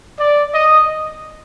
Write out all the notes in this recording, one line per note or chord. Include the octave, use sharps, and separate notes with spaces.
D5
D#5